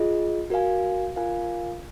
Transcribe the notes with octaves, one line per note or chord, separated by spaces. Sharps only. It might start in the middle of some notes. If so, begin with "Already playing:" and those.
Already playing: F4 G#4 D#5
F#4 A#4 F5 G#5
F4 A#4 F5 G#5